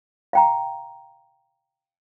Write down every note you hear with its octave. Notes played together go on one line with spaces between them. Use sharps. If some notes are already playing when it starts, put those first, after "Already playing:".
F5 G5 A#5